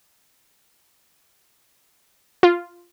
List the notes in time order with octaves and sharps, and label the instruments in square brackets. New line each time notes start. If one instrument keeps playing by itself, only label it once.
[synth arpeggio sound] F4